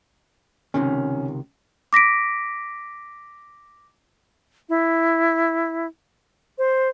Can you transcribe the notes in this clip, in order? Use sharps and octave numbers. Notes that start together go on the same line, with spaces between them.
C#2 C3 D#3 C#4
D6 A#6 B6 D7
E4
C5